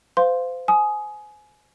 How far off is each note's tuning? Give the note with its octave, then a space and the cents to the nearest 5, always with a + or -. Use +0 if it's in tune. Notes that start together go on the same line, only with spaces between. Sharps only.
C5 -35 F5 +0 C6 +0
G#5 +25 D#6 +0